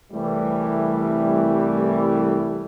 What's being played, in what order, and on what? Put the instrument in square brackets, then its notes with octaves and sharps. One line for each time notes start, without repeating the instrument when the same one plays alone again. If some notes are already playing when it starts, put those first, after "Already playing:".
[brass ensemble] C2 E3 G3 A3